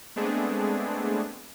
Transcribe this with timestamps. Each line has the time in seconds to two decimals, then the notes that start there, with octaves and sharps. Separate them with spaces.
0.16 G#3 A3 B3 C4 D4 G#4